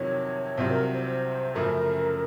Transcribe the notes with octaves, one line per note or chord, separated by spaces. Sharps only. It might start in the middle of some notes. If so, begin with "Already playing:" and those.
Already playing: F2 C3 D#3 F#3 C#5
C2 C3 F#3 C4 F4 C5
A#4
C5
C5
F#2 C#3 F3 A3 A#4